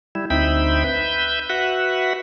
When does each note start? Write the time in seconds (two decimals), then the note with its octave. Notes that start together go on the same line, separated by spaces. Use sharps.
0.15 G3 E4
0.30 D2 C4 D#4 E5 G5 B5
0.84 B4 E5 G6
1.49 F#4 B4 E5 F#5